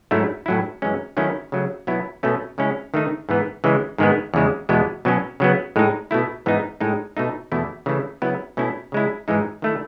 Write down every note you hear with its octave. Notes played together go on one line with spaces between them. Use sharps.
G#2 F#3 A3 C#4 E4
A2 F#3 C#4 E4
F#2 E3 G#3 C#4
D#3 F#3 A3 C#4 E4
C#3 F#3 A3
B2 F#3 B3 E4
B2 A3 C#4
C#3 G#3 C#4 E4
D#3 A3 D#4
G#2 E3 B3
C#3 E3 G#3
G#2 D#3 G#3 B3
E2 C#3 G#3
E2 B2 G#3 B3
B2 F#3 C#4
C#3 F#3 B3
A2 G#3 D#4
B2 A3 E4
G#2 E3 B3 D#4
A2 G#3 D#4
B2 A3 D#4
E2 B2 A3 E4
C#3 E3 A3 E4
C#3 F#3 B3 E4
B2 A3 C#4 E4
C#3 G#3 C#4 E4
G#2 E3 G#3 D#4
D#3 A3 E4